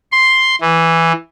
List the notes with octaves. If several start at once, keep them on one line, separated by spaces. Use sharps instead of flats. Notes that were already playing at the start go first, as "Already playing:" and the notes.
C6
E3